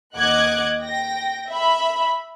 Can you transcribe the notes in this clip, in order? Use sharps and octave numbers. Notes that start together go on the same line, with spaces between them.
D#2 D#5 F#5 D6 F#6 G#6
G5 A#6
E5 B5